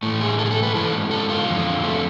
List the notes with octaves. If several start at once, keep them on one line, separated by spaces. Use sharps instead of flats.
A2 E3 A3
G#4
A4
G#4
A4
B4
G#2 E3 A4
A4
F4
F2 D3
A3